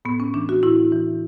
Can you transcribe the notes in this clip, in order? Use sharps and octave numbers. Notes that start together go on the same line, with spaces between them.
A2 B3
C#4
E3 D4
F#4
A2 E4
E3